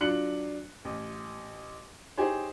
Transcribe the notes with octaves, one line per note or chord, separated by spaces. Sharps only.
F#3 D4 F4 F#6 C#7 F#7
A1
D#4 G4 G#4 C5 C#5